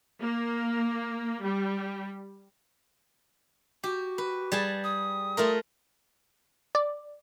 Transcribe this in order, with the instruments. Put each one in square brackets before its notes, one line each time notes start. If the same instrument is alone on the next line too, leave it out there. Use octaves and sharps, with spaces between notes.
[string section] A#3
G3
[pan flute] F#4 [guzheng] G4
[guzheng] B4
G3 G#4 A5
[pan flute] D#6
[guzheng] A3 F4 A#4
[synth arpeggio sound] D5